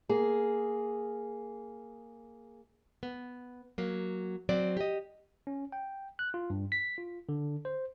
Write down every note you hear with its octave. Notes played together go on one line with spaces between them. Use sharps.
A#3 G#4
B3
F#3 A#3
F#3 C4 D5
G4 D#5
C#4
G5
F#6
F4
G2
B6
F4
D3
C5